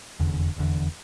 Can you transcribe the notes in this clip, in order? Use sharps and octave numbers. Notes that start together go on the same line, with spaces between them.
F1 E2 D3
F1 E2 D3